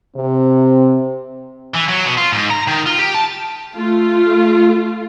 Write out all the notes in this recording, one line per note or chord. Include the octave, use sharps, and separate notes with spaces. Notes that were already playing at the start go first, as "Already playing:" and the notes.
C3 C4
E3
F#3
B2
F4
G#2
A#5
D#3
F4
G4
A5
A3 F4